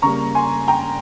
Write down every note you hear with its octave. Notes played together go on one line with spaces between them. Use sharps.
C#3 G3 A#3 A#5 C#6
G#5 C6
G5 A#5